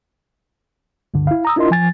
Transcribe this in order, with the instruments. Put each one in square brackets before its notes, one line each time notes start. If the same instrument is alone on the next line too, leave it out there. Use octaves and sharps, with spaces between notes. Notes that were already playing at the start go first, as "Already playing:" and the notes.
[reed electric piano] C#2 G2 D3
E4 F5
A#5 D#6 E6
D4 E4 F4 A#4 D#5 C6
F3 G#5 A6